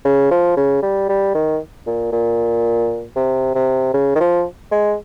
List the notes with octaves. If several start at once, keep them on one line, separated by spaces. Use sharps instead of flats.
C#3
F3
C#3
G3
G3
D#3
A#2
A#2
C3
C3
C#3
D#3
F3
G#3